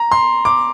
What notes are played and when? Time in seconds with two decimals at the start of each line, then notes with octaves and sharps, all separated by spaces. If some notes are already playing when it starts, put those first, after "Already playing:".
Already playing: A#5
0.12 C6
0.45 D6